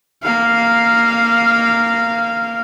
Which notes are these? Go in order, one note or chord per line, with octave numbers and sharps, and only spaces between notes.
A#3 F5